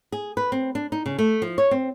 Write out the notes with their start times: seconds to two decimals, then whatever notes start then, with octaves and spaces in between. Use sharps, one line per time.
0.12 G#4
0.37 B4
0.52 C4
0.75 D4
0.92 D#4
1.06 C#3
1.19 A3
1.42 F3
1.58 C#5
1.71 C4